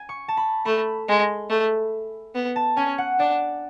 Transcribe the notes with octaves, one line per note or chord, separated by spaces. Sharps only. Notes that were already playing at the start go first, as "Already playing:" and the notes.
Already playing: G#5
C#6
A5
B5
A3 B5
G#3
A3
B3
A5
C#4 G#5
F#5
D4 D5